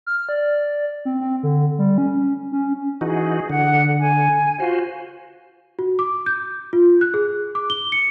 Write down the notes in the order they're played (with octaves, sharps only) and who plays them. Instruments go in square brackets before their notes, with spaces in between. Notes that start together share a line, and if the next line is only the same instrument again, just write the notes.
[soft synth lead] F6
D5
C4
C4
D3
G3
C#4
C#4
[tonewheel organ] E3 D#4 F#4 [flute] G#4
[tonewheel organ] D3 [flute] F#5
[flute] G#5
[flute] F4 [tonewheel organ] F#4 C5
[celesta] F#4
D6
G6
F4
F#6
G#4
D6
G7
C#7